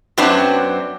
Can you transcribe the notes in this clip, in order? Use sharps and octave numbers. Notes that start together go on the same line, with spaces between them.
F#2 F#3 B3 C4 D4